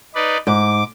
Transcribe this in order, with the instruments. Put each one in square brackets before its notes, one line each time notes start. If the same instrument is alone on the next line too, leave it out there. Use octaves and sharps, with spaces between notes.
[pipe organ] D#4 B4 D5
[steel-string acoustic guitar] G#2 [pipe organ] D6